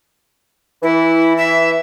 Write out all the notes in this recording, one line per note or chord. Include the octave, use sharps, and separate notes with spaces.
E3 E4
E5